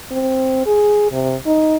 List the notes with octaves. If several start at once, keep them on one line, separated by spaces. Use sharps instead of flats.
C4
G#4
C3
D#4